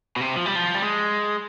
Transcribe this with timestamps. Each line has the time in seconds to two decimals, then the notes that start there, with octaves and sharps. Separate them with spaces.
0.16 B2
0.21 C3
0.36 F3
0.46 G3
0.56 F3
0.75 G3
0.82 G#3